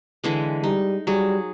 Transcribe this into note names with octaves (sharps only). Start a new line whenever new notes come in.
D3 E3 G#3
G3 D#4
F#3 G3 G#4